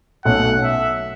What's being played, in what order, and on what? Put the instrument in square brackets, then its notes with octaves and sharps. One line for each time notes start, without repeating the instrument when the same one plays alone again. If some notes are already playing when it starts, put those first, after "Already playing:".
[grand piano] B1 B2 A3 C#4 [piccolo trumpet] F#5
[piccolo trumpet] E5